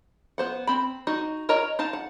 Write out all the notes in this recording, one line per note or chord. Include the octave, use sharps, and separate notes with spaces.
B3 C5 F#5
C4 B5
D#4 F#4 D#5
A#4 C#5 D#5 A#5
D#4 F5 A5
F#5